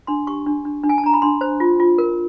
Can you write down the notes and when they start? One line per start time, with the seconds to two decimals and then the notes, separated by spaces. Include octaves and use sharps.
0.07 D4 C6
0.27 G4 C#6
0.46 D4
0.65 D4
0.84 D4
0.89 G#5
0.98 A5
1.04 D4 A#5
1.14 B5
1.22 D4 C6
1.41 C5
1.60 F4
1.80 F4
1.98 A#4